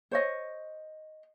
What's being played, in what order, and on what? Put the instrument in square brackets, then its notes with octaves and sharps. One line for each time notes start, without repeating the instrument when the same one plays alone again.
[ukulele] C5 C#5 D#5